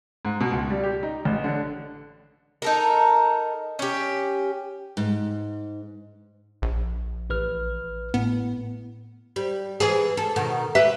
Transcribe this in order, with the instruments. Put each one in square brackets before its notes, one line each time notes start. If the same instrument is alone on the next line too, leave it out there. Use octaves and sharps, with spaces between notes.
[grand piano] G#2
B2
C#2
G3
G4
D#4
A1
D3
[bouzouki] D#4 A4 A#4
C#4 G4
[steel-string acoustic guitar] G#2
[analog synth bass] A#1
[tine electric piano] A1 B4 F6
[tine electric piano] A2 [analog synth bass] B3
[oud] G3
E3 G#4
A4
B2 D#3
G4 B4 E5